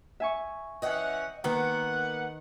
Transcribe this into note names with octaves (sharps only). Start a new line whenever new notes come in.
E5 G#5 C#6
E3 C#4 D#5 F#5 G5
D#3 A#3 B3 F#5 G5